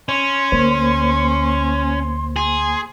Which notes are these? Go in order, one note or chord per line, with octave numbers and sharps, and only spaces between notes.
C#4 C6
D2 A#3 C5
G#4 C6